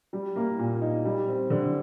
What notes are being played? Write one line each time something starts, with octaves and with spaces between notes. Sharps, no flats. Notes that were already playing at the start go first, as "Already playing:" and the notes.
G3
A#3
A#2
D#4
G3
C4
D3